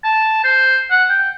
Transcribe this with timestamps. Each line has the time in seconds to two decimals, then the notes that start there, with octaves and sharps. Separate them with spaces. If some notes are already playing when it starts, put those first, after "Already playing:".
0.04 A5
0.44 C5
0.90 F#5
1.09 G5